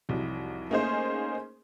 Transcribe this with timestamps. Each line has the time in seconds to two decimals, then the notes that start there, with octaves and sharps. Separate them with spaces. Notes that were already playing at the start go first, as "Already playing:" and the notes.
0.09 F1 C2 F#3
0.70 A3 A#3 C#4 D#4 G#4 C5